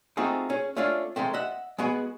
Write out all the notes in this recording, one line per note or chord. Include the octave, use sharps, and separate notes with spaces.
A3 C4 D#4 F4 F#4 G#4
C#4 G#4
A3 C#4 D4 F4 F5
D#3 G#3 A3 C4
D#5 E5 F#5
G#3 B3 F#4 G#4